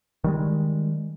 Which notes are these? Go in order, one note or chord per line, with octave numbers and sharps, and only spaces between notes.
D#3 G3 G#3